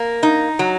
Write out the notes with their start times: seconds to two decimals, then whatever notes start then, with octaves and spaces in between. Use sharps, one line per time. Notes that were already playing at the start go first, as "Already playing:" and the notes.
Already playing: A#3
0.23 D#4
0.59 F#3